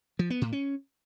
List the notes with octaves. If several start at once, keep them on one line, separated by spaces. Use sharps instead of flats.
F3
B3
A2
C#4